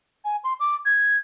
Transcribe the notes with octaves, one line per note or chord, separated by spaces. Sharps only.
G#5
C6
D6
G#6